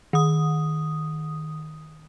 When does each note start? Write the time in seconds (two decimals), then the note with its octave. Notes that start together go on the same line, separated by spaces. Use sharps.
0.13 D#3 D#6